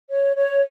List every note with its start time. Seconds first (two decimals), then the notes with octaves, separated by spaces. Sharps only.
0.10 C#5
0.36 C#5